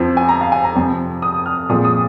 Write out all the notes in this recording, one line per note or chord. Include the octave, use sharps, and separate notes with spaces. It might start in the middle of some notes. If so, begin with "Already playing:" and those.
Already playing: F2 F3 C4 C5
G#5
A#5
F5
G#5
A#5
F2 C3 F3 C4
D#6
F6
A#2 F3 G#3 C4 D#6
D#6